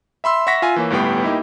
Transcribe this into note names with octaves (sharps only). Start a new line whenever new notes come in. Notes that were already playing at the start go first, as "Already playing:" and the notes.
E5 B5 C6 E6
E5 F#5 C#6 A#6 B6
F4 G#5
E3 A#3 C#5
G1 A2 G3 B3 G5
A#3 D#4 E4 G4